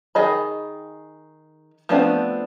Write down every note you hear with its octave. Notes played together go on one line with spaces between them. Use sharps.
D#3 G#4 D#5 B5
F3 A3 B3 C4 D4